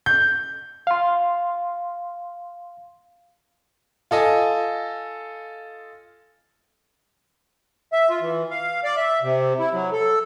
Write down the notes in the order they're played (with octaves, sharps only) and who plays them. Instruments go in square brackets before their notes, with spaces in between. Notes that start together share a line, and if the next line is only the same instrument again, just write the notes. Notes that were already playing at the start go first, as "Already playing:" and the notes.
[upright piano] G6
[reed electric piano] F5 C6
[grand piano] F4 A4 D#5 G#5
[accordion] E5
F4
E3
F5
D5
E5
C3
E4
F#3
A4